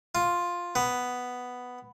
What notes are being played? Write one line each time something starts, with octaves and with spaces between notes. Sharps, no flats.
F4
B3